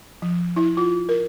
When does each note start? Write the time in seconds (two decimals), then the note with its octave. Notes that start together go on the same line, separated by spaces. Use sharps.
0.22 F3
0.56 E4
0.77 F4
1.09 A#4